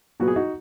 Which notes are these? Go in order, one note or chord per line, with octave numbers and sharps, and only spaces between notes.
A#2 F#3 B3 F#4
G#4
D#4 F#4